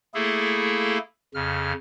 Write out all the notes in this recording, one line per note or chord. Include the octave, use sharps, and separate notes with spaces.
A3 A#3 E4 G#4 A4
F2 C#3 F6